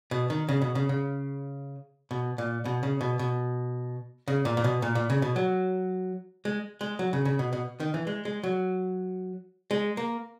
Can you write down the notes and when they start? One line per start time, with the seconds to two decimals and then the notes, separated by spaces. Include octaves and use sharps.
0.11 B2
0.30 D#3
0.49 C#3
0.62 B2
0.75 C#3
0.89 C#3
2.11 B2
2.38 A#2
2.65 B2
2.83 C#3
3.01 B2
3.19 B2
4.28 C#3
4.45 A#2
4.57 A#2
4.64 B2
4.82 A#2
4.95 A#2
5.10 C#3
5.22 B2
5.36 F#3
6.45 G#3
6.81 G#3
6.99 F#3
7.13 C#3
7.25 C#3
7.39 B2
7.53 B2
7.80 D#3
7.94 E3
8.07 G#3
8.25 G#3
8.43 F#3
9.71 G#3
9.97 A#3